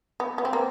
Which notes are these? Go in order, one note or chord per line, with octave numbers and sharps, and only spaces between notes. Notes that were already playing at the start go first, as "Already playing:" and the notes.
B3
B3
C4
A#3